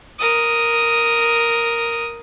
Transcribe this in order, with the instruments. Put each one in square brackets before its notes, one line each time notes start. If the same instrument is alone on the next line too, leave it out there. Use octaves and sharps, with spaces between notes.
[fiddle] A#4 D#6